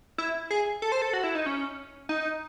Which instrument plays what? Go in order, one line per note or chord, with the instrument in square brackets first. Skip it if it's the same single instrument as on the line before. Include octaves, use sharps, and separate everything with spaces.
[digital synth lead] E4
G#4
A4
C5
A4
F#4
E4
D#4
C#4
D#4